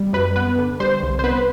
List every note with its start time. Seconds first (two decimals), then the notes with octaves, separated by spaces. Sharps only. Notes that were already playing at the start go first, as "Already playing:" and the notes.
Already playing: G3
0.13 F#2 B4
0.36 B3 B4
0.59 D3
0.80 G3 C5
1.03 C2
1.19 C5
1.24 B3 B4